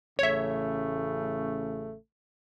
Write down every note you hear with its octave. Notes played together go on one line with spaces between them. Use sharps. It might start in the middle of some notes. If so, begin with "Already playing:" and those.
A1 C#3 A3 C#5 E5